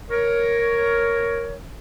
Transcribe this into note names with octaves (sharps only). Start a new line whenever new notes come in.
A#4 C#5